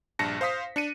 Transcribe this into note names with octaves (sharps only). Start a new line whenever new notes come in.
A#1 G2 A5 A#6 C#7
C5 F5 D#6 B6
D4 C#7 D#7